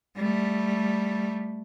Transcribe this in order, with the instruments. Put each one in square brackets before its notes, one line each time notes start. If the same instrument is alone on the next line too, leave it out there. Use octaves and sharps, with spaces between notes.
[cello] G3 A3